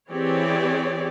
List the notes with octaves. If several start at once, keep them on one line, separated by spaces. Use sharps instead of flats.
E3 C4 G4 G#4 C#5 D5